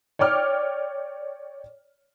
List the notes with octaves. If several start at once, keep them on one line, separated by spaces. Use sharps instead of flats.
C#5 D5 G5 D6 F6